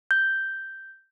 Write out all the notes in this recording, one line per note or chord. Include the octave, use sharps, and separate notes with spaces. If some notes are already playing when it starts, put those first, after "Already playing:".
G6